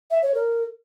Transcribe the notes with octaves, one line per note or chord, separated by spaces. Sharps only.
E5
C#5
A#4